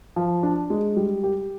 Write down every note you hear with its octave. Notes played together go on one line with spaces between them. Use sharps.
F3
D4
G#3
G3
G4